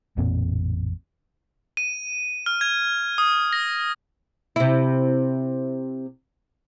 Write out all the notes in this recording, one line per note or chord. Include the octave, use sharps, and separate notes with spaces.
A1 F2 A#2 C4
D#7
F6
G#6
D#6
A#6
C3 E4